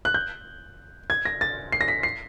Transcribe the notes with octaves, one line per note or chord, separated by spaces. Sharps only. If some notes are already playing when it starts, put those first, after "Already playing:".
F#6
G6
G#6
A#6
A6
C7
A#6
B6
C7